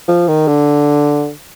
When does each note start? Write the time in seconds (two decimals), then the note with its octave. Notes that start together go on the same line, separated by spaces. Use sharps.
0.08 F3
0.28 D#3
0.47 D3